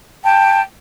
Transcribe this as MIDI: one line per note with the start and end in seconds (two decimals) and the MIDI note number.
0.23 0.60 79
0.23 0.60 81